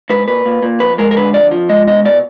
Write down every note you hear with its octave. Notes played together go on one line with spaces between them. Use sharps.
G#2 B4
A#2 B4
A#2
A#2
F2 B4
G#3 A#4
A#4
D3 B4
F2 D5
F3
G#3 D#5
B2 D#5
B2 D5